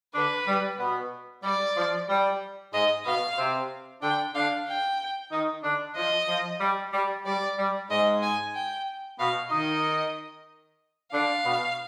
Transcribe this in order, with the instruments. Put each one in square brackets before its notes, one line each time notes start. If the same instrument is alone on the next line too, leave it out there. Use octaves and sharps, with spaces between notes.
[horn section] D3 D4 [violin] B4
[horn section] G3
B2 B3
[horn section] G3 [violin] D5
[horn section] F3
G3
[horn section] G#2 G#3 [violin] D#5
[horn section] B2 B3 [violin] F5
[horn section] C3 C4
[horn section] D3 D4 [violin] G5
[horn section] D3 D4 [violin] F5
[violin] G5
[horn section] D#3 D#4
D3 D4
[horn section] F3 [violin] D#5
[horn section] F3
G3
G3
[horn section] G3 [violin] D5
[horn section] G3
[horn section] G#2 G#3 [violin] D#5
[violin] G#5
G5
[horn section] B2 B3 [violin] F5
[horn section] D#3 D#4 [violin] D#5
[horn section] D3 D4 [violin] F5
[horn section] B2 B3